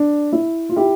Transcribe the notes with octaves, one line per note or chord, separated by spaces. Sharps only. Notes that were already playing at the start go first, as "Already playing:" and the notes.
Already playing: D4
E4
F4
E4 G4